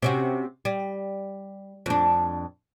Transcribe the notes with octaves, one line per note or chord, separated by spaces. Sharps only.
C3 C#4 F#4
G3
F2 D4